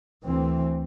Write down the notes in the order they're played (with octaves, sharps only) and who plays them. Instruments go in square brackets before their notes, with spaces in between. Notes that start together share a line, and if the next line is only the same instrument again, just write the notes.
[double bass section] D2 E3 C4